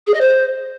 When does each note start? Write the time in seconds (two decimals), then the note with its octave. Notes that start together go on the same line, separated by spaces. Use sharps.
0.07 G#4
0.13 D#5
0.20 C5